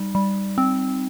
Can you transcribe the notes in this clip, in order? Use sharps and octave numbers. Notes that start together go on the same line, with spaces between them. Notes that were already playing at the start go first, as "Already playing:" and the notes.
Already playing: G3 D#4
G3
C4